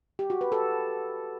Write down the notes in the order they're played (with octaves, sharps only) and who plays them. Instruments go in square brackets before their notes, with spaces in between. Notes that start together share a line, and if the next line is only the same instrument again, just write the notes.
[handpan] G4
F#4
B4
A4